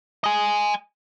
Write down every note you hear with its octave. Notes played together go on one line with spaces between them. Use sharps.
D#5 G#5